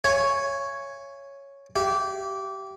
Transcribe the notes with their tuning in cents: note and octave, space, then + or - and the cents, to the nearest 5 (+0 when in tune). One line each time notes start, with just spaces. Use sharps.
C#5 +0 E5 +45 G#5 +0
G4 -20 E5 +45